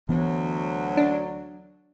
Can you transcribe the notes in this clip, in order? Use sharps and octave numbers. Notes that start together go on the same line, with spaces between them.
D2 E3 F#3 B3
D4